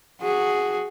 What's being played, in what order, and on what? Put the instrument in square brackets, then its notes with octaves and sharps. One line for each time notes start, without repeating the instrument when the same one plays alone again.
[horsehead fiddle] F#4 G#4